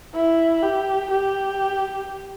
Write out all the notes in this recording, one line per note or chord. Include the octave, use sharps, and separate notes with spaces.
E4
G4
G4